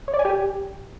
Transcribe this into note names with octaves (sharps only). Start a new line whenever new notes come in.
C#5
D5
G#5
G4